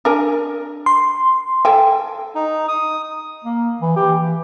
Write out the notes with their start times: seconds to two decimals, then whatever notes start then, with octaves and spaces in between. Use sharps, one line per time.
0.05 D4 A#4 G#5
0.86 C6
1.65 A4 G5 G#5
2.35 D#4
2.68 D#6
3.44 A#3
3.81 E3
3.96 G4
4.19 E3